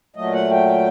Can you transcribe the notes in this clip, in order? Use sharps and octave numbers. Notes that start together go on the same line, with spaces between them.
A#2 F#3 A3 D#5
F#5
G5